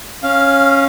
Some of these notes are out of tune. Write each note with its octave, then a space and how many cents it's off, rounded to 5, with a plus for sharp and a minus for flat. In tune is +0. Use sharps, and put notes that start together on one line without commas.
C#4 -10 F5 +0